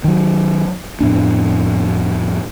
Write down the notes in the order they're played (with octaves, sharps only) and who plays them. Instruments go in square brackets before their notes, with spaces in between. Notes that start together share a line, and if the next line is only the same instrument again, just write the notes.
[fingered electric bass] D#3 F#3
F2 A2 B3 D4